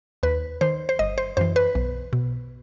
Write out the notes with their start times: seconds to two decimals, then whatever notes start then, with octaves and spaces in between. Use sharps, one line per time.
0.23 D#2 B4
0.61 D#3 C5
0.89 C5
0.99 G1 D#5
1.18 C5
1.37 F#2 E3 C5
1.56 B4
1.75 B1
2.13 B2